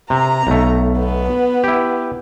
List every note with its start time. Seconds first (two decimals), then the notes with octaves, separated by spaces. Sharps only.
0.10 C3 A#5
0.47 B1 A3
0.98 B3
1.64 E4 G4